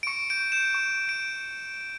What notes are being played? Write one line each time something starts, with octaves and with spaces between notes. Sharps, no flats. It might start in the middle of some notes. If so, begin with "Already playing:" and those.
D7
C#6 C#7
G6 D7
G6 E7
C#6
C#6
D7